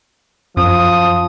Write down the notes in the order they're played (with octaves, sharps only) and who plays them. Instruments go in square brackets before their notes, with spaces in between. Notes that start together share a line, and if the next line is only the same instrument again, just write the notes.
[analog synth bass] F#2 [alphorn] F3 [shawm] D#6